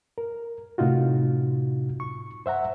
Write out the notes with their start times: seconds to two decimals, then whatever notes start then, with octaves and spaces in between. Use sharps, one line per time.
0.18 A#4
0.78 A2 C3 D#4 F4 F#4
2.00 C#6
2.46 C5 E5 F#5 A#5